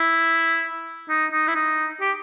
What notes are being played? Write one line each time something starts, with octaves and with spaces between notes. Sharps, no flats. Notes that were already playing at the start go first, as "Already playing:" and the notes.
Already playing: E4
D#4
D#4
E4
D#4
G4